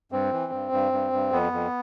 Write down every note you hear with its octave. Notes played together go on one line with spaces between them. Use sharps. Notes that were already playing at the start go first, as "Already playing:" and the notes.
G2 C4
E3
G2
G2
G2
G2
F2 B3
F2